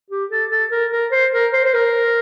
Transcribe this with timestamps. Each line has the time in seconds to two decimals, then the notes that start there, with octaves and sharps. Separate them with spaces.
0.10 G4
0.31 A4
0.50 A4
0.71 A#4
0.92 A#4
1.12 C5
1.33 A#4
1.53 C5
1.65 C5
1.74 A#4